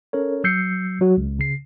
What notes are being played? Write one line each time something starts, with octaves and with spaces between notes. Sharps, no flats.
C#4 A4 A#4 C#5
F#3 E6 G6 C7 C#7
F#3 F#4
C#2
C#3 C7